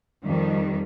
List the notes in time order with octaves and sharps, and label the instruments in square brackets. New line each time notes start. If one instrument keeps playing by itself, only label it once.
[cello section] F2 D#3 G3